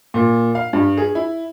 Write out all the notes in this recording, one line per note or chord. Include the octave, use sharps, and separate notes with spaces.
A#2
F5
G2
G#4
E4